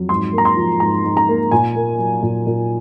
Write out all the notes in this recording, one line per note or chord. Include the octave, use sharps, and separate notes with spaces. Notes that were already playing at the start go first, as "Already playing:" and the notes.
Already playing: F2 F#3
G#2 C6
A#3
A#5
C6
F3
G#2 A#5
G#2
A#5
A#3
A#2 G#5
A#3
F#3
A#2
A#2